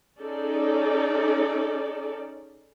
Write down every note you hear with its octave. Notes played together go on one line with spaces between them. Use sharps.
C#4 D#4 G#4 A4 D5